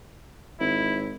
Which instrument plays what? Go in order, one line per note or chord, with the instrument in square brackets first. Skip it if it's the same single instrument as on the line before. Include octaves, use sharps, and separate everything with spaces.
[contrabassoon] G#1 [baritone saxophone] E4